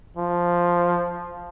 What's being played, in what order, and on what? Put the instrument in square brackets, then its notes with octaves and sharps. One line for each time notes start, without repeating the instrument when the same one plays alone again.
[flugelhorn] F3